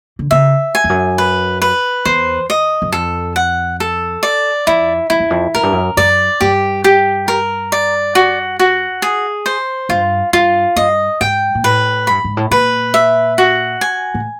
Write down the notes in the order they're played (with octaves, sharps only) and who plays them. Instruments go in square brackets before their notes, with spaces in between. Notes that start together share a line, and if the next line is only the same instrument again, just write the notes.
[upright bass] D3
[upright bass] C#3 [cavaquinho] E5
[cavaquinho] G#5
[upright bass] F2
F#2
[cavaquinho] B4
B4
[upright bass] E2 [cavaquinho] C5
[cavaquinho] D#5
[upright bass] F#2
[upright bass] F2 [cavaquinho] A4
[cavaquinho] F#5
A4
D5
[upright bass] F2 [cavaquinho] E4
[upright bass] F2 [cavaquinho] E4
[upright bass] E2
F2
[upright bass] F#2 [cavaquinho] A#4
[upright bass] G2
F#2
[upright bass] F#2 [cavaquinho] D5
[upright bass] G2 [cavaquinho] G4
[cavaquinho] G4
A#4
D5
F#4
F#4
G#4
C5
[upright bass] G2 [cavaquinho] F4
[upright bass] G2 [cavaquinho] F4
[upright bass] G2 [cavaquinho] D#5
[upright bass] G#2 [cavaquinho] G5
[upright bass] A#2
[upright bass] A2 [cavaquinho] B4
[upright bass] G2 [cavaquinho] B5
[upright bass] G#2
A2
[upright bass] A#2 [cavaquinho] B4
[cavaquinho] E5
F#4
G#5
[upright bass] A2